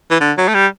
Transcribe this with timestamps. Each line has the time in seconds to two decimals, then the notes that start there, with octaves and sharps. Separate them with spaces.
0.11 E3
0.20 D3
0.38 F#3
0.48 A3
0.55 G3